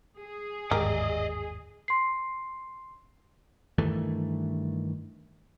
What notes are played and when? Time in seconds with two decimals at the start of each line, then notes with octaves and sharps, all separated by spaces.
0.20 G#4
0.71 G1 D#2 G#2 G4 A#4 D5 D#5
1.88 C6 C7
3.78 G2 D#3 E3 A3